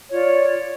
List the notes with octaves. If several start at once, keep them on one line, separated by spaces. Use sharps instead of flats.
F4 C#5 D5